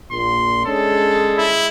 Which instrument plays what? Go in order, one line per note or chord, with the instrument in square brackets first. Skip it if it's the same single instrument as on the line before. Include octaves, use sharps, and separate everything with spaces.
[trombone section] A#1 A#2 [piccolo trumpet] C6
[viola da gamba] G#3 [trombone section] C#4 D4 [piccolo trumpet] A4
[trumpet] E4